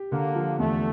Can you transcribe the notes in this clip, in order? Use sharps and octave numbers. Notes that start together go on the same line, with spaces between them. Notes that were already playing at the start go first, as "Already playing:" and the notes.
Already playing: G4
D3 A#3
F3
E2 A3